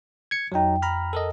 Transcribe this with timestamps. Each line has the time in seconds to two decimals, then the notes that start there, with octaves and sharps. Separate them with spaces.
0.31 G#6 C#7
0.52 F2 F#3 D#4 G5
0.82 A#5 B5 F6
1.13 A4 A#4 D#5